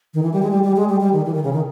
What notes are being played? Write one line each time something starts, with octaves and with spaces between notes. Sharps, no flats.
D#3
E3
G3
G#3
G3
G3
G#3
G3
G3
D#3
E3
D#3
C#3
D#3